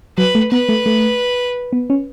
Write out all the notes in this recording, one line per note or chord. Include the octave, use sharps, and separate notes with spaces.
F#3 B4
A3
B3 B4
A3
A3
B3
C#4